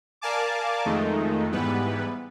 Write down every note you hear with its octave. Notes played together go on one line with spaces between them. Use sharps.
A#4 D5 F5 G#5 A5 D6
F2 D#3 G#3 A3 D#4
G#2 E3 G3 B3 B4